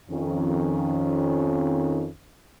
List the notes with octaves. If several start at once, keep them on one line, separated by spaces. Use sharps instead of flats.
F2 D#3 C#4